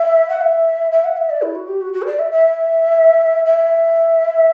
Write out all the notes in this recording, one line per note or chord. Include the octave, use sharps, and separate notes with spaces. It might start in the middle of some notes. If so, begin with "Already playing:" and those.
Already playing: E5
F#5
E5
E5
F#5
E5
D5
E4
F#4
G4
F#4
F#4
C5
D5
E5
E5
E5